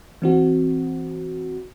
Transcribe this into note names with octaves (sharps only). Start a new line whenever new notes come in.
E3 C4 F#4